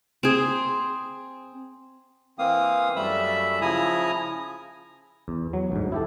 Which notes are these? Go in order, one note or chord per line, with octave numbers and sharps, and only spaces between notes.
C4 G#4
E3 A#3 C4 F5 D#6
F#2 G3 A3 E5 B5 E6
C#3 F3 E4 G#5 A#5 D#6
E2
F#3
D2 G#2
E4 G4 A4